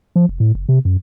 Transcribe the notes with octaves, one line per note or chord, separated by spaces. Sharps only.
F3
F1
A2
F#1
C3
F#2